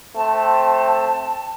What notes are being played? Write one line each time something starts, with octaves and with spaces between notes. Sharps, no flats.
A3 C4 A5